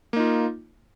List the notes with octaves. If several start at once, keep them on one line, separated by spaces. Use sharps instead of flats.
A#3 D#4 F4